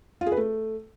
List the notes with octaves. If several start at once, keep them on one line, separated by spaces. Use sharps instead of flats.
F4
G#4
B4
A3